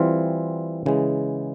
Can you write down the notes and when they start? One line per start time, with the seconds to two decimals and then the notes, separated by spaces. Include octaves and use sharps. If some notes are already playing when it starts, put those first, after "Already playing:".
Already playing: E3 G3 C4 F4
0.86 C#3 E3 G#3